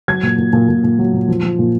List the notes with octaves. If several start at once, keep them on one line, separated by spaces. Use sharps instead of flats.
F#3 G#6
A#2
A#2
A#2
A#2
A#2
F#3
A#2
F3
F3
A#2